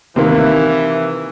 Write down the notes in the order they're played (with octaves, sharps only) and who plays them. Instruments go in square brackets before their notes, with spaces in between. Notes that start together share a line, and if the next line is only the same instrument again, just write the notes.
[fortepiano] C3 D#3 A#3 [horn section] E3